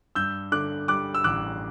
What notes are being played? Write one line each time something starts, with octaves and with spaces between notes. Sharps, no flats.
G2 E6 G6
D3 D6 F#6
G3 D6 F#6
E6
A1 D6 F#6